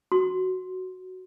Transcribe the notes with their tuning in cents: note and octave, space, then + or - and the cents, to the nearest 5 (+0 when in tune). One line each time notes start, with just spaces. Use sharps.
F#4 +5 C6 +0